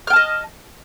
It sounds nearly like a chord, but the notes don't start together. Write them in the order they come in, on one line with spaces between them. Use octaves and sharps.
F6 G5 A5 D#5